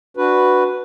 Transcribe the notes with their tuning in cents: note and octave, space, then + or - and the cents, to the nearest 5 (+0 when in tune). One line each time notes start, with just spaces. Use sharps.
D4 +0 F#4 +0 B4 +0